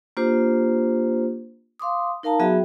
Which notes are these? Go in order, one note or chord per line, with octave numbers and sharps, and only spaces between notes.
A#3 D4 F4 G4 C5
F5 C6 D6 D#6
D#4 A#4 F5 A5 A#5
F#3 B3 F#4 G#4 E5 G5